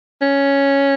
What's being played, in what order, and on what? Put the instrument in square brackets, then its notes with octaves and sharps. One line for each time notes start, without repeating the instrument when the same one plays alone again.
[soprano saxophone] C#4